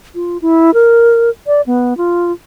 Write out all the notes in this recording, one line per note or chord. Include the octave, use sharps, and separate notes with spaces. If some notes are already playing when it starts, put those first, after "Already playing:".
F4
E4
A#4
D5
B3
F4